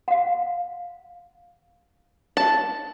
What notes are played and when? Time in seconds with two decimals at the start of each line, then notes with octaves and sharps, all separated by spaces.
0.08 F5 F#5
2.37 A5